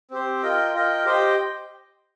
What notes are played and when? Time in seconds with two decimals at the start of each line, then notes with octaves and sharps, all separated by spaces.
0.11 C4 G4 C5
0.42 F4 A#4 D#5 G5
0.74 F4 A#4 D#5 G5
1.05 G4 C5 D#5 G5